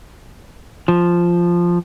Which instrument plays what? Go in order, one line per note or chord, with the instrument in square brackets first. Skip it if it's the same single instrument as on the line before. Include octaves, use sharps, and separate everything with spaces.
[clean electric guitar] F3